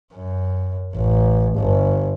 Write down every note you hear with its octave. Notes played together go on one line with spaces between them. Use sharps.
F#2
A1
G1